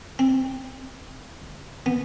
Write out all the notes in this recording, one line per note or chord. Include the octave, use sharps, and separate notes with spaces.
C4
B3